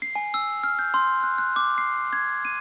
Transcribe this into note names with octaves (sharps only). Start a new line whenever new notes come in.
C7
G#5
E6
F6
G6
C6
F#6
F#6
D6
C7
G#6
D#7